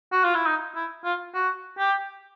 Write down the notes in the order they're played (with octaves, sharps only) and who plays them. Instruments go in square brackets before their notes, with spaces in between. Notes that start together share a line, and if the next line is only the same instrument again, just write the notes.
[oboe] F#4
F4
E4
D#4
E4
F4
F#4
G4